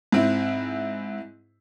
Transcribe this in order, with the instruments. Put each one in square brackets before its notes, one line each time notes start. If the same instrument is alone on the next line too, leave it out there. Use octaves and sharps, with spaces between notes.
[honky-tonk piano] G#2 C4 E4